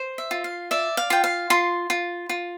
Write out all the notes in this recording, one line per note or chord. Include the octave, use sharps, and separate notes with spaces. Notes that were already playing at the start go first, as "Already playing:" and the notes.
Already playing: C5
E5
F4
F5
D5 E5
F5
F4 G5
F5
F4 C6
F4
F4